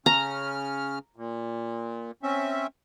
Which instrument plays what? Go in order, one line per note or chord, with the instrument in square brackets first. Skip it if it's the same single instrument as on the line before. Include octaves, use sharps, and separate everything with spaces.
[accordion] C#3 C#4 F6 [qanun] A#5
[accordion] A#2
C4 C#4 E5